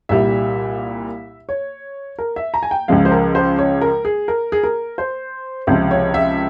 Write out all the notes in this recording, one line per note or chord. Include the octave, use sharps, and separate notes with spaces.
C2 A#2 G3 E5
C#5
A#4
E5
A#5
G#5
G5
C#2 C#3 F3 G#3 F5
C5
A#4
C5
C#5
A#4
G#4
A#4
G#4
A#4
C5
C#2 C3 F3 C5
C#5
E5